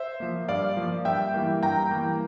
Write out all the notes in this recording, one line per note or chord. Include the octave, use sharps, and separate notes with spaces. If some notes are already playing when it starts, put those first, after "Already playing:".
Already playing: C5 E5
F3 A#3
G2 D5 F5
F3 A#3
G2 E5 G5
E3 G3 A#3
G2 G5 A#5
E3 G3 A#3